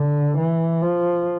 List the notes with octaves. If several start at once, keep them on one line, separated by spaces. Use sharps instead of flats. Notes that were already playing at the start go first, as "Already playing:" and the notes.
Already playing: D3
E3
F3